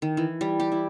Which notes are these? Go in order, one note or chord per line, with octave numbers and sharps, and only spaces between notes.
D#3
E3
G3
G4
E4